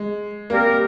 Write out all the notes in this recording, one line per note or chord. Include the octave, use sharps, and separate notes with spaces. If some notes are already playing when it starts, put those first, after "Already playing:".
Already playing: G#3
G3 A#3 C4 G4 A#4